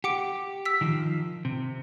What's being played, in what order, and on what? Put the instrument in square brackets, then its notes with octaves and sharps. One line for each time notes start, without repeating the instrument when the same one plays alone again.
[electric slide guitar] G4 [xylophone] F#5 D6 D7
[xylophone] E6 B6
[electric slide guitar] D#3 F3
C3